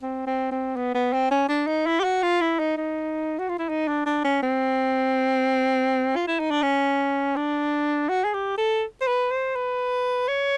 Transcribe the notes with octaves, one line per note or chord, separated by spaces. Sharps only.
C4
C4
C4
B3
B3
C4
C#4
D4
D#4
E4
G4
F#4
F4
E4
D#4
D#4
F#4
F4
E4
D#4
D4
D4
C#4
C4
F4
E4
D#4
D4
C#4
D4
F#4
G#4
G4
A4
C5
B4
C5
B4
C#5